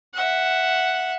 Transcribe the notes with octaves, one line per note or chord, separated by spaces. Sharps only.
E5 F#5